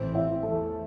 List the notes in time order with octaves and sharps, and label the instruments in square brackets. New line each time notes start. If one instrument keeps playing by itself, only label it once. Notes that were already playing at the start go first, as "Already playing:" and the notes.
Already playing: [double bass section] A1 A2 E3 C4 [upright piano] C5
[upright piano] E4 E5
[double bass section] E2 E3 A3 [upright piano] A4 A5